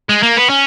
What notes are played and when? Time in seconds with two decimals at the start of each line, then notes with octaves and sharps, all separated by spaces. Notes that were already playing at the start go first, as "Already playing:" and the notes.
0.09 G#3
0.23 A#3
0.37 B3
0.50 C#4